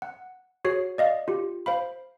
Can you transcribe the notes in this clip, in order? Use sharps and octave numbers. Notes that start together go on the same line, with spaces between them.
F#5
F#4 G#4 C#5 C7
D5 D#5 F5
F4 G4
C5 F5 B5